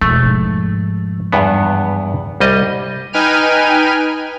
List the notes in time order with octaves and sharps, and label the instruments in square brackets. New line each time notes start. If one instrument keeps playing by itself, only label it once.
[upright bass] E1 [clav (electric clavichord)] A3
[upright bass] G#2 F3
[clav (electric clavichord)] E2 G2 B3
C2 G3 D#5
[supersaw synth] D#4 B4 G5 G#5 F6 D#7